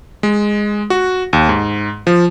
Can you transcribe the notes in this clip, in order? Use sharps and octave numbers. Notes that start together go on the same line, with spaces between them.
G#3
F#4
D#2
G#2
F3